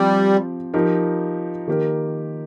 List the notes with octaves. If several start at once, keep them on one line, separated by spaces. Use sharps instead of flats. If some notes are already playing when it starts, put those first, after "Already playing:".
Already playing: F3 G3 C4 G4
F3 D#4 G4 A#4
D#3 A#3 G4 A#4